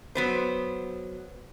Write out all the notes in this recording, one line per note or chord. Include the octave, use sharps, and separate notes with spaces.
F#3 B3 C5